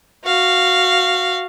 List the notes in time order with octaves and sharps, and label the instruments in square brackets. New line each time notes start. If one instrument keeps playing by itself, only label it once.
[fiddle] F#4 F5